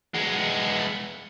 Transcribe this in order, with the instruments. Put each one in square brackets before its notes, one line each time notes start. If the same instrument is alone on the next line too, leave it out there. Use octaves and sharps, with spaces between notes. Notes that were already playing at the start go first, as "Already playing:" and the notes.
[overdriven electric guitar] G#3 B3